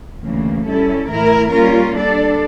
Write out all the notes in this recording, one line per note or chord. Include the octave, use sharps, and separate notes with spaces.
D2 C#3 E3 A#3
G3 C#4 E4 A4
A2 E3 A3 E4 A#4
G3 A#3 C#4 F4 A#4
G3 D4 A4 D5